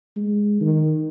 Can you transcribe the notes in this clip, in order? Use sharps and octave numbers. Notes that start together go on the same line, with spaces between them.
G#3
D#3